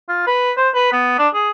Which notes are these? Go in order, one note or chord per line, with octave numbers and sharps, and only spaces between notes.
F4
B4
C5
B4
B3
D4
G#4